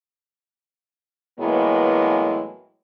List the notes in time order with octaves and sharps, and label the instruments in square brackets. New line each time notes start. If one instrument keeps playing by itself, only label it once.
[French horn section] A2 E3 F#3 G#3 A#3 B3